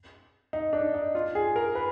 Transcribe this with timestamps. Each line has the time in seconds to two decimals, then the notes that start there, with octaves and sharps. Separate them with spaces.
0.53 D#4
0.73 D4
0.94 D#4
1.15 F4
1.35 G#4
1.56 A#4
1.75 B4